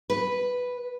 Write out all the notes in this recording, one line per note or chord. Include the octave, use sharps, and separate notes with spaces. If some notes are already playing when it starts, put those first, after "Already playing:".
B4